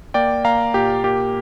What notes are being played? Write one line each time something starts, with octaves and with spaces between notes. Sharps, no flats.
A#3 D5 G5
A#3 F5 A#5
A#2 G4
A#3 G4